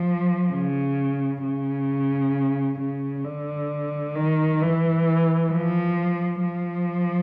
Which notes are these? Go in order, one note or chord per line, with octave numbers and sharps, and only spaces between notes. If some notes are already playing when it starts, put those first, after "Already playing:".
Already playing: F3
C#3
C#3
C#3
D3
D#3
E3
F3
F3